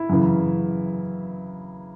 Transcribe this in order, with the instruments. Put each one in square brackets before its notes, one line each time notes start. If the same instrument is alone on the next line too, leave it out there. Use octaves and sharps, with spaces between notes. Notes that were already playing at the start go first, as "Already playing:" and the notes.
Already playing: [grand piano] E4
F#2 C#3 E3